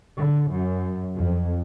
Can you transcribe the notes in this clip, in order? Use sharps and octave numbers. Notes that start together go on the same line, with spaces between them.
D3
F#2
F2